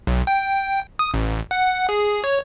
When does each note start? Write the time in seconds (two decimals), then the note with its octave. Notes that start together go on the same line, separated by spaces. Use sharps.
0.07 B1
0.27 G5
0.99 D#6
1.14 A1
1.51 F#5
1.89 G#4
2.24 C#5